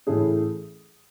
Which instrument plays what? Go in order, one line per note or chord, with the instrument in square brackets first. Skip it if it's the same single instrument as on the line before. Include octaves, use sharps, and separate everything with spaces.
[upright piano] A2 E3 A3 C#4 G#4